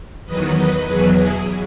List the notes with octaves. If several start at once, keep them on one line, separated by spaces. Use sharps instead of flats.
E2 D#3 F#3 B4 D#5
B4 D#5
E2 B2 F#3 G#4 B4
E4 G#4